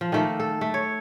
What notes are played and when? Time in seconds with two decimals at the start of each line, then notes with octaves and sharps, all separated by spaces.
0.01 F3
0.12 D#3 A3 A#3
0.40 A4
0.61 A3
0.74 C#5